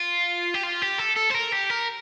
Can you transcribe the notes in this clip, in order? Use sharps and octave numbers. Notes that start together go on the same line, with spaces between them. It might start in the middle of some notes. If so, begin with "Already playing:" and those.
Already playing: F4
G4
F4
G4
A4
A4
C5
A#4
G4
A#4